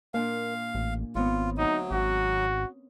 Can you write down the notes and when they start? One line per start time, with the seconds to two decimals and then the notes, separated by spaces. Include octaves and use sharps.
0.14 A#2 A#3 D4 F5 G#5
0.75 A1
1.15 G#1 B3 C4 F4 C#5
1.58 D2 F#3 D#4 D#6
1.91 G#1 C#4 F#4